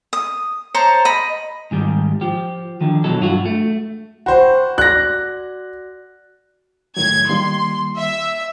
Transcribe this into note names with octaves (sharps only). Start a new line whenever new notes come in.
D#6
C5 C#5 A5 A#5
D#5 B5
G#2 D#3 G3
F3 G4
D3 D#3 F3
B2 E3 F#3 A4
G2 F4 F#4
A3
F#4 C5 F#5 G5 B5
F#4 D5 F#6 A#6
A2 D#3 F#3 G#6
D#3 G3 A#3 C6
E5